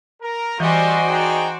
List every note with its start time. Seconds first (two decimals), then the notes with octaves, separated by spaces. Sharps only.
0.22 A#4
0.60 E3 G3 F#4 C5 D5 D#5 G#5 C6
1.08 D#4 G#4 G5